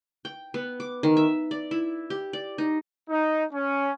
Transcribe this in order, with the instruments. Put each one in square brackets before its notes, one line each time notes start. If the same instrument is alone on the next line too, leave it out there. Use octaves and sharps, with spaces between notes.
[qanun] G5
B3
D6
D#3
E5
D5
E4
G4
D5
D#4
[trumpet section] D#4
C#4